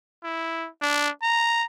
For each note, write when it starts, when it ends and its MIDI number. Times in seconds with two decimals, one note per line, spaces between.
0.24 0.69 64
0.81 1.09 62
1.23 1.65 82